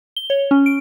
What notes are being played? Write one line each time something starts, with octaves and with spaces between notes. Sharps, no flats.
G7
C#5
C#4
D7